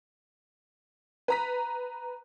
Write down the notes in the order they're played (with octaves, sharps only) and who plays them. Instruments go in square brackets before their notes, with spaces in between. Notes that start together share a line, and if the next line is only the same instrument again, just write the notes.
[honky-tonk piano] B4 A#5 B6